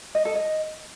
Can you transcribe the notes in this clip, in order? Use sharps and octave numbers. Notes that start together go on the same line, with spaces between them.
D#5
A4
D#5